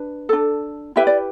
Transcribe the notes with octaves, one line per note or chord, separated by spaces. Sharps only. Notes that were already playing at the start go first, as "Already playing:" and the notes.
Already playing: D4 B4
D4 A4
E4 G4 B4 E5
D5